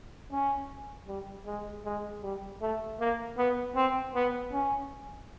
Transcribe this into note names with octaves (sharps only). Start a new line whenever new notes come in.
C#4
G3
G#3
G#3
G3
A3
A#3
B3
C4
B3
C#4